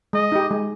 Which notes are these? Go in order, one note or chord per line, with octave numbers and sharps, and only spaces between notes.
G#3 D#5
D#4 G4
G#3